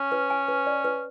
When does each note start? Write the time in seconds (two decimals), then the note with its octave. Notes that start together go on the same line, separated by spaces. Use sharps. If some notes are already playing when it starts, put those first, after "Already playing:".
Already playing: C#4
0.12 B4
0.30 G#5
0.49 B4
0.67 D5
0.85 B4